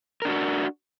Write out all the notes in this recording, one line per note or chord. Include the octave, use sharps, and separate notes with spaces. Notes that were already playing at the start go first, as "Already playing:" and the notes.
D4 F#4 A#4